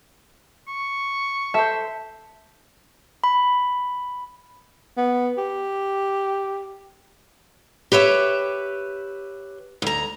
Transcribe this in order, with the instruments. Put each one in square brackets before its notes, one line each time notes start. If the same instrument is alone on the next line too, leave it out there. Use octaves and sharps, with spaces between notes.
[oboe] C#6
[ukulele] A4 C5 [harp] E5
[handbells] B5
[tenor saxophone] B3
G4
[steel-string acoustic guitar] G4 B4 C#5 E5
D2 A#5